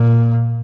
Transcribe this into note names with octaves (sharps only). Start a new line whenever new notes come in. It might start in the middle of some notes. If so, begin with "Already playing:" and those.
Already playing: A#2